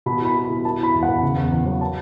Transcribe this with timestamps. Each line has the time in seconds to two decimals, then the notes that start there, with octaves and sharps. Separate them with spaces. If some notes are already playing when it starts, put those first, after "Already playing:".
0.06 B2 B5
0.21 E4 B5
0.35 E4
0.45 B2 B5
0.64 E4 A5
0.79 E4 B5
0.94 E2
1.03 F#5
1.08 E2
1.23 C#3
1.37 E2
1.52 E2
1.66 F#3
1.81 A5